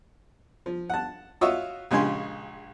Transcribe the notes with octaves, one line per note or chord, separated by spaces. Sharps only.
F3
F#5 A5
F4 F#4 C#5 D#5 E5 E6
A#1 C#3 G#3 G4 G#5 C6